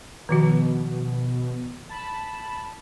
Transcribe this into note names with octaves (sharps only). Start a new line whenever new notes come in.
B2 D#3 F3 F#4
A5 B5